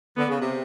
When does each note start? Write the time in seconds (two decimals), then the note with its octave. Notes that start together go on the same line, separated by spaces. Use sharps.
0.17 D3 B3
0.28 C#3
0.40 C3